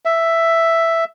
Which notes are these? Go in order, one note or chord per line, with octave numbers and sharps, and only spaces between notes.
E5